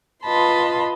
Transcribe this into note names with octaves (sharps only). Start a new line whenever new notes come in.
F4 B4 D#5 A5 B5 C6